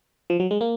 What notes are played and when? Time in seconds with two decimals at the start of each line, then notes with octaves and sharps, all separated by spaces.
0.30 F3
0.40 F#3
0.51 G#3
0.61 A#3